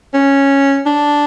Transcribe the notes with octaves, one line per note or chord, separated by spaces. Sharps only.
C#4
D4